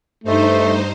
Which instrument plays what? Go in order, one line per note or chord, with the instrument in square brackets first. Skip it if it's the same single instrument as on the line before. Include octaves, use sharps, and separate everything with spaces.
[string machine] G2 D#4 C5 [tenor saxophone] A3